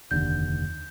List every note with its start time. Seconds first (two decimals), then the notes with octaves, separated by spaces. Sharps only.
0.11 F1 D#2 D3 G6